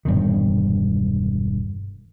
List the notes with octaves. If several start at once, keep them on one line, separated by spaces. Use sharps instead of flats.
E1 G2 A#2 D#3